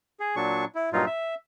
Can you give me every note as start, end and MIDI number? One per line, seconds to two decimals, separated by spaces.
0.20 0.36 68
0.36 0.65 46
0.36 0.65 54
0.36 0.65 62
0.36 0.65 85
0.75 0.90 64
0.93 1.05 43
0.93 1.05 46
0.93 1.05 54
0.93 1.05 63
0.93 1.05 65
1.06 1.35 76